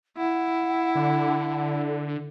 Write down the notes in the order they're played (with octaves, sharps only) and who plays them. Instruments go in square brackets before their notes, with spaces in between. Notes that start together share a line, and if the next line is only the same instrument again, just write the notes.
[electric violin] E4 [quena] F#5
[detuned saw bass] D3